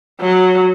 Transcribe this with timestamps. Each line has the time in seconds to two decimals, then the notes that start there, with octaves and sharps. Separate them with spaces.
0.21 F#3